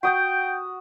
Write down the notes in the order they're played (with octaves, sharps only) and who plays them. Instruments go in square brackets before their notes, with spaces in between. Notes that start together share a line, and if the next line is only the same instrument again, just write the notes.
[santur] F#4 D#6 [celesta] F#5 G6 [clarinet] G5